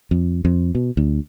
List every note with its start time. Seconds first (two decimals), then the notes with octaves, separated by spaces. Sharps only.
0.11 F2
0.45 F2
0.75 B2
0.97 D2